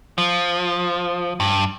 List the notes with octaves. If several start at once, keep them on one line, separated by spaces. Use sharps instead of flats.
F3
G2